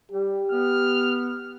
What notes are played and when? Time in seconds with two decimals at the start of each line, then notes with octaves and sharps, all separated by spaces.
0.11 G3 G4
0.52 B3 F6